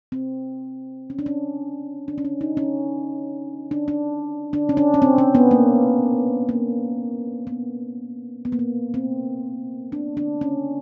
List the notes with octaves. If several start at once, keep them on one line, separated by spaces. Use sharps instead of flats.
C4
C#4
D4
C#4
D4
C#4
D4
D#4
C#4
D4
D4
D4
C#4
D4
C#4
C4
C#4
B3
A#3
A#3
B3
B3
A#3
B3
C4
D4
D4
C#4